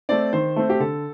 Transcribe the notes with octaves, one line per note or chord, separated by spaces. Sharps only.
A3 C4 D5
D#3 C5
A3 C4
G4
D3 A4